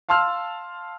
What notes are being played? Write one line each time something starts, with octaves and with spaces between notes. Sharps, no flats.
F5 A5 C6 E6 F6